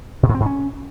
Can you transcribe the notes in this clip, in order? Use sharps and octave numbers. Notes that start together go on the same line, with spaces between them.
B2
G#2
C4
G#2
C#4